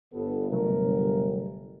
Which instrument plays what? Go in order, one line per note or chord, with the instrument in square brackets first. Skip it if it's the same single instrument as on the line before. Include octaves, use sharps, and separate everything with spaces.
[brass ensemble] G1 [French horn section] B3 A4
[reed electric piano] C3 F#3 A3 [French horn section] A#4